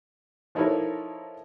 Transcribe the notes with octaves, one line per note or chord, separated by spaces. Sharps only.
F3 D#4 E4 A4 A#4 C#5